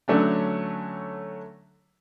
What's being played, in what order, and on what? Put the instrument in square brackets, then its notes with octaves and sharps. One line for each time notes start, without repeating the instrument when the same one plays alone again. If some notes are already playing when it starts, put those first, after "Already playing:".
[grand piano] D3 F#3 A3 C#4 D4